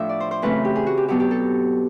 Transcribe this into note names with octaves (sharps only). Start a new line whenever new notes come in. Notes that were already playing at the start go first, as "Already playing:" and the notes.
Already playing: A2 F3 A3 D4 E5
D5
C5
C5
F#2 C#3 E3 A3 C4 B4
G4
G#4
F#4
G4
B2 F#3 B3 D4 G4
G4
A4